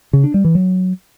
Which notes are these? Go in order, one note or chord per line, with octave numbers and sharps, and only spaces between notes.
C#3
D4
G3
E3
F#3